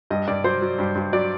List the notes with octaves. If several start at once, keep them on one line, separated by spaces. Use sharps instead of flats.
G2 D#5
G2 D5
F#3 C5
F#3
G2
G2
F#3 D5